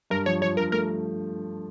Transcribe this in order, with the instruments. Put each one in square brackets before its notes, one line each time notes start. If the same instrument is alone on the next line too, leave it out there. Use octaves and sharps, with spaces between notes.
[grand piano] G2 [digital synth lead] A#4
[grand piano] F3 [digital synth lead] C#5
[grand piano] F3 [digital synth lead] C#5
[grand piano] G2 [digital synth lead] A#4
[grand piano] A3 [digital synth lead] A#4